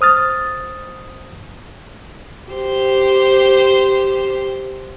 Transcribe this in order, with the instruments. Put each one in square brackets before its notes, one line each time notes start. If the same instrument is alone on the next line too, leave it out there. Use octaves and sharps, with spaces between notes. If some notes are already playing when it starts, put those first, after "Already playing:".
[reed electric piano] C5 D#6 F6 A6
[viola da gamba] G4 C5